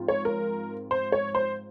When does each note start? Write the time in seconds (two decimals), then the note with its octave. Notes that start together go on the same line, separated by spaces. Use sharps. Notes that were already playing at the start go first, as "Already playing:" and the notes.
Already playing: G#2 F3 C4 F4
0.08 C#5
0.25 A#4
0.91 C5
1.12 C#5
1.35 C5